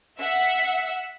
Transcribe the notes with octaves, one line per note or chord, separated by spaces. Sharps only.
E5 F#5